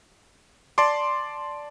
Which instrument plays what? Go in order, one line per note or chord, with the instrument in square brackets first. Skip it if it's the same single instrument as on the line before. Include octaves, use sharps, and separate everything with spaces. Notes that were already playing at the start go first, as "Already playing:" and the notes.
[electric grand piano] D5 A5 C6 D6